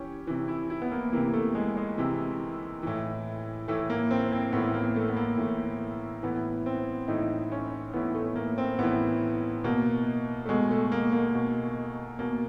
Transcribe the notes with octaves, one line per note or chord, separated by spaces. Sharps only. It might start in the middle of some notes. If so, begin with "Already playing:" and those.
Already playing: E3 C#4 G4
C3 E3
E4
E4
B3
A#3
C3 E3 A#3
A3
G#3
G#3
C3 E3
A2 E3
A2 E3 A3
A#3
C4
C4
A2 E3 B3
A#3
A3
B3
A#3
A2 E3
A2 E3 B3
C4
A2 E3 D#4
C#4
A2 E3 B3
A3
A#3
C4
A2 E3 B3
B2 A#3
A3
B2 G#3
A3
A#3
A#3
B2
B2 A#3